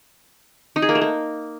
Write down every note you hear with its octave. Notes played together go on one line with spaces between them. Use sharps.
D#4
G#4
A#3
A3
A#3